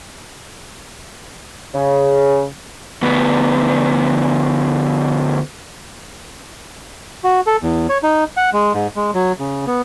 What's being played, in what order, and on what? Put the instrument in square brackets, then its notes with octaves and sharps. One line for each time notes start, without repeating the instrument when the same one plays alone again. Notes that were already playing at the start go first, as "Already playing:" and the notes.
[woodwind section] C#3
[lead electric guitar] D2 B3
[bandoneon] F#4
A4
E2
C#5
D#4
F#5
G#3
G#2
G#3
F#3
C#3
B3